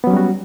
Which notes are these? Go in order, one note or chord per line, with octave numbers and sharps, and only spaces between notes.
F#3 G3 B3 C#4 F#4